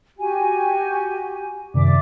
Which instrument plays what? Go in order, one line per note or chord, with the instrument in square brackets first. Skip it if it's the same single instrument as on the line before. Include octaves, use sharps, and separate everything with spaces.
[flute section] F#4 G4 G#5
[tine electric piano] F#2 C3 D#3 [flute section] D5 E5 D6